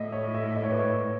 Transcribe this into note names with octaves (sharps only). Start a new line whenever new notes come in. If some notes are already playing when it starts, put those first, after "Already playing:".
Already playing: A2 D#5 E5
C#5
E5
D#5
C#5
B4
C#5